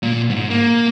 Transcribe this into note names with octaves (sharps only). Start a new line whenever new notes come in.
A#2
G#2
A#3